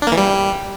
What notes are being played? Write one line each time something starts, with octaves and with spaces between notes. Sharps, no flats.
D4
A#3
E3
G3